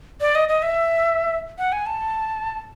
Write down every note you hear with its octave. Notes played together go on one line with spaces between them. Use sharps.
D5
D#5
D#5
E5
F#5
G#5
A5